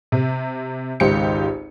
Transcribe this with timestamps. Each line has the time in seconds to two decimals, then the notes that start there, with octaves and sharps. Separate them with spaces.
0.12 C3
1.00 G#1 C#2 G4 C5 C#7